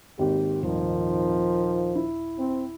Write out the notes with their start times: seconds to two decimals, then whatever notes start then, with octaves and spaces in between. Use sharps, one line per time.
0.19 G#1 D#2 G4
0.63 D#1 D#3 F3
1.95 E4
2.38 C4